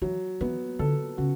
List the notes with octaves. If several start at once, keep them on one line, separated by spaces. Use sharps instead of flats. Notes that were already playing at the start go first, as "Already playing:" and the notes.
E3 F#3
E3 B3
D3 A4
C#3 F#4